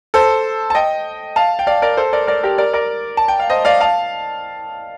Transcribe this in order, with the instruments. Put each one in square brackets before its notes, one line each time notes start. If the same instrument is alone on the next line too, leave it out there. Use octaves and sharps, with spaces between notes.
[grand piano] A4 C5
A5
D#5 G5
F5 A5
G5
D5 F5
A#4 D5
A4 C5
A#4 D5
A#4 D5
G4 A#4
A#4 D5
A#4 D5
A5
G5
F5
C5 D#5
D5 F5
F5 A5